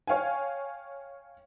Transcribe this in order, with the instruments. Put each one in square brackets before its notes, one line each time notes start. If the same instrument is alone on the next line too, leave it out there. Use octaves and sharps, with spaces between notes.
[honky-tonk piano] C#5 F5 G5 G#5